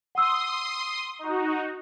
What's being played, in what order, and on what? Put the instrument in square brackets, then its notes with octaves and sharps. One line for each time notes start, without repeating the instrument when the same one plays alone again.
[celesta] F#5 E6 [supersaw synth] C6 D#6
[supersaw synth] D#4 F#4